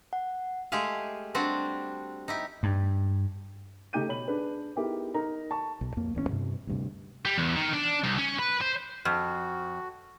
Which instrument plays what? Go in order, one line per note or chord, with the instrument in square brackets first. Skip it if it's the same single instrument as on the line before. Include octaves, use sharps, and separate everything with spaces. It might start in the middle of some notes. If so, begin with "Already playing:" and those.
[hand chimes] F#5
[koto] G#3 A3 G4 G#4 F5
G3 C4 D4 F#4
D#4 E4 G4
[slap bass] G2
[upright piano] C#3 A3 D#4 G4 G6 D#7
B2 C#5 B5 F#7
D4 G#4 B4
B3 D#4 E4 G4 G#4 A#4
D#4 A#4 A#5
A5 C#6
[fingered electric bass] B1
F2 A#3
D1 E2 B3 C#4
G2 C3
D2 G2 C3
[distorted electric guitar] G3
E2
D#3
D4
C2
C#4
B4
C5
[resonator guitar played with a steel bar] F2 [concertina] F#4 [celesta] C#6 F6